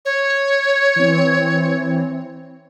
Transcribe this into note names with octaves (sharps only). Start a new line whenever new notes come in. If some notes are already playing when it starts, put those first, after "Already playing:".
C#5
E3 C4